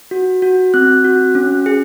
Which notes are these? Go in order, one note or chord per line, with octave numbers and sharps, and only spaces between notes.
F#4
F#4
C4 F#6
F#4
C#4
G#4